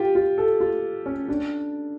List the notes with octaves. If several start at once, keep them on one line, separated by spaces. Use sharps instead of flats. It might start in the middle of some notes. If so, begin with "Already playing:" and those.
Already playing: F4 G4
F4
A4
F4
C#4
D4